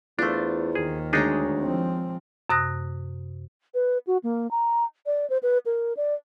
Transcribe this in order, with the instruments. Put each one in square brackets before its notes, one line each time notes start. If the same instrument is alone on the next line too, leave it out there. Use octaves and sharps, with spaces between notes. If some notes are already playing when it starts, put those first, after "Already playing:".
[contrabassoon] E2 [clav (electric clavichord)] A3 D4 [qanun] F4 C5
[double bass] D#2 D#3 [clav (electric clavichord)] G#4
[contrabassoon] D2 [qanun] G#3 C#5 A#5 [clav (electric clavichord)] D4 D#4 G#4
[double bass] F3 C4
[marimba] F#2 C3 D#6 F#6 A#6
[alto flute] B4
F#4
A#3
A#5
D5
C5
B4
A#4
D5